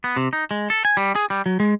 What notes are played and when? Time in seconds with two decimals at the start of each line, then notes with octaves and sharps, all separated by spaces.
0.04 B3
0.16 C3
0.33 D#4
0.51 G#3
0.70 A4
0.85 G#5
0.97 G3
1.15 G#4
1.30 G3
1.46 F#3
1.60 G#3